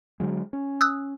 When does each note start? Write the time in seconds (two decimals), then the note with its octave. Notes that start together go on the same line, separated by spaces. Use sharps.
0.20 D3 F#3 G#3
0.53 C#4
0.81 D#6 E6 F#6